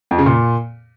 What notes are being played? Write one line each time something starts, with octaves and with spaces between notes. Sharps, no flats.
F2
C#3
A#2